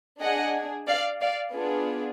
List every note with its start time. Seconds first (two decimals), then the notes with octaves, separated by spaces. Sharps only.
0.21 D4 G#4 D#5 F#5
0.87 D5 F5
1.21 D5 F5
1.54 B3 D4 F4 G#4